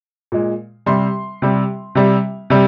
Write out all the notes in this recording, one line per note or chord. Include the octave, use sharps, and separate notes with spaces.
A#2 G#3
C3 G3 C6
C3 G3
C3 G3
C3 G3